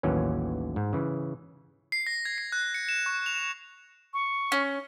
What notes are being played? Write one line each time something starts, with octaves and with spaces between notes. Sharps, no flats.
A1 D#2 E3 F#3 C#4
G#2
C#3 E3
C7
A#6
G#6
C7
F#6
C#7
E7
C#6
F7
C#6
C#4